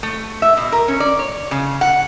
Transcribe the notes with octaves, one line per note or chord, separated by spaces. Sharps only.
A3
E5
B2
A#4
C#4
D5
C#5
C#3
F#5